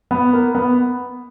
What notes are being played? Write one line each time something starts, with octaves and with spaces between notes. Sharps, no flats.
B3
A#3
B3